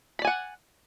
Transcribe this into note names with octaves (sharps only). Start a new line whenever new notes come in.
D5 F#5 G#5 B5